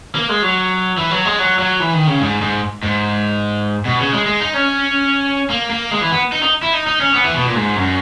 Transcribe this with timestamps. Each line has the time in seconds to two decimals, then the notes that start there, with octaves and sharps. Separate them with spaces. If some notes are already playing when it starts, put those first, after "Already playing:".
0.15 A#3
0.29 G#3
0.42 F#3
0.98 E3
1.11 F#3
1.25 G#3
1.39 F#3
1.59 F#3
1.80 E3
1.93 D#3
2.07 C#3
2.21 G#2
2.41 G#2
2.83 G#2
3.85 B2
3.99 C#3
4.12 G#3
4.26 G#3
4.40 D#4
4.54 C#4
5.50 A#3
5.70 A#3
5.91 G#3
6.01 E3
6.12 B3
6.32 D#4
6.42 D#4
6.63 E4
6.73 D#4
6.87 D#4
7.01 C#4
7.14 B3
7.24 E3
7.35 B2
7.45 A#2
7.55 G#2
7.76 F#2